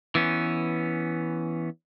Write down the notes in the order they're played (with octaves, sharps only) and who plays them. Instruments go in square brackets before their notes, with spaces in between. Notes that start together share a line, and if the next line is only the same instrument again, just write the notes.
[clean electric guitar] E3 B3 C#4